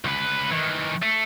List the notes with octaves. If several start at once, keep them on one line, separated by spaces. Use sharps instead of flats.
C#2 B4
D#3 E3
A3